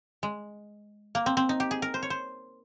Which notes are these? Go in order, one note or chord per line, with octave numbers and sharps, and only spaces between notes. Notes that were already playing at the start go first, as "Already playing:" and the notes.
G#3
A#3
C4
C4
D#4
G4
G#4
A#4
C5
C#5
C5